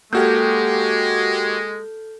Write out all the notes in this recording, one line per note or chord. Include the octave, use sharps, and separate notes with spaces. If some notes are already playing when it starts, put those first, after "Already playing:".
G#3 A#3 F#4 G4 A4 F6 G6